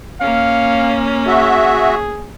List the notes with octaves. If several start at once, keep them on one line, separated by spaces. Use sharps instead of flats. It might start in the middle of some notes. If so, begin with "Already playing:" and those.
A#3 C#4 F5
F#4 G#4 E5